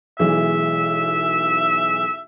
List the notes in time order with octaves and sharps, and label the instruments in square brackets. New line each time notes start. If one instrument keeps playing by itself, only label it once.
[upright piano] B1 E3 G#3 [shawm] E5